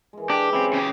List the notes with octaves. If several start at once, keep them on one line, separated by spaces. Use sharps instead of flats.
E3 G#3
D4 G4 G#4
F#3 G#3 C4 C#4 E4
C#3 G4